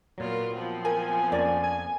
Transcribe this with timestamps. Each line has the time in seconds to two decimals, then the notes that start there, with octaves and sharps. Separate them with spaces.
0.18 A#2 F#3 B3 F4 A#4
0.54 F3 B3 C4
0.85 A#4 G#5
1.32 F2 A#3 C#4 D5 A5
1.63 G#5